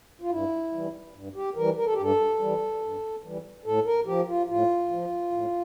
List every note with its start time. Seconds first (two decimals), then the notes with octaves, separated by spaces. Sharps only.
0.21 F4
0.30 G2 E4
0.72 E3 G3
1.14 G2
1.35 G4
1.55 E3 G3 A#4
1.76 A#4
1.85 A4
1.93 G4
1.97 G2 A4
2.39 E3 G3
2.81 G2
3.23 E3 G3
3.64 A2 A4
3.86 A#4
4.06 F3 G4
4.28 F4
4.49 A2 F4
4.90 F3
5.31 A2